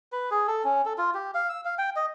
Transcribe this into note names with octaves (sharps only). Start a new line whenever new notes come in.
B4
G#4
A4
C#4
A4
F4
G4
F5
E6
F5
G5
D#5